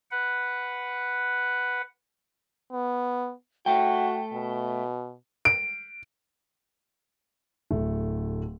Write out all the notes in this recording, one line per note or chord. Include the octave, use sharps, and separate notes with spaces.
B4 F#5
B3
A3 F#4 G5
B2
D7
D1 A3